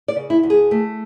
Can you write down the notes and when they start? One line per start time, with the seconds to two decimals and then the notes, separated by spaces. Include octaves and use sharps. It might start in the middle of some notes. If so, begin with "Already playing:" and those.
0.08 D5
0.16 C#3
0.30 E4
0.43 D2
0.50 G#4
0.71 A3